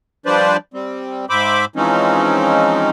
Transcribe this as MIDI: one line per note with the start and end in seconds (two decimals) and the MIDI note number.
0.26 0.57 53
0.26 0.57 55
0.26 0.57 62
0.26 0.57 71
0.26 0.57 72
0.26 0.57 74
0.74 1.26 55
0.74 1.26 60
1.29 1.65 44
1.29 1.65 72
1.29 1.65 76
1.29 1.65 83
1.29 1.65 86
1.76 2.90 52
1.76 2.90 53
1.76 2.90 56
1.76 2.90 60
1.76 2.90 61
1.76 2.90 63